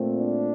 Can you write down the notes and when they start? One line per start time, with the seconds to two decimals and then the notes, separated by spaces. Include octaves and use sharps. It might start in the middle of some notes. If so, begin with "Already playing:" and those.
Already playing: A#2 A3 C4
0.18 D4